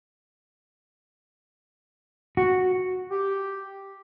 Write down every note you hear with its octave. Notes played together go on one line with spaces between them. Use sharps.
F#4
G4